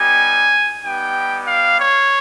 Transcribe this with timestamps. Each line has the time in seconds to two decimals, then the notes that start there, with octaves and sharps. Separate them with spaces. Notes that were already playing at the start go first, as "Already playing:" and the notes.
Already playing: G3 B3 D#4 G4 G#5
0.82 G3 B3 D#4 G4 G5
1.47 F5
1.79 C#5